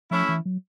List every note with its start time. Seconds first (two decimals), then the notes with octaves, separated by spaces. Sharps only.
0.11 F3 A3 C#4 E4
0.29 E3
0.45 F#3